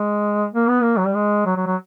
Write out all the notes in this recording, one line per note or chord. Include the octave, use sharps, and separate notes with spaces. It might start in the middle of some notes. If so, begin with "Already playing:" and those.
Already playing: G#3
A#3
B3
A#3
F#3
G3
G#3
F#3
F#3
F#3